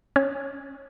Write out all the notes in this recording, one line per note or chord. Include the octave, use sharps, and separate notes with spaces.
C#4 C#5